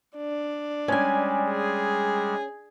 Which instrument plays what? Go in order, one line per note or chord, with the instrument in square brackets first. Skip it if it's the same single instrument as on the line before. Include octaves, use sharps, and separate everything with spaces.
[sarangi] D4
[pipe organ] G3 G#3 [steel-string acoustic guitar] C#4 G#5
[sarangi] G#4